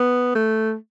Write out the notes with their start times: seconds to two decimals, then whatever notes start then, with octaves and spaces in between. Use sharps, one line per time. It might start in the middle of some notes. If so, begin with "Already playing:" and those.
Already playing: B3
0.35 A3